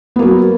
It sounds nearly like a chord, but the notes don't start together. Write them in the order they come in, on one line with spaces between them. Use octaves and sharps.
B3 A#3 F#3